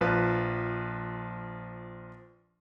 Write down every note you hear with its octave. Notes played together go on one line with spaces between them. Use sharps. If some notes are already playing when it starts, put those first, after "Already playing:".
A#1 F3 B4 F5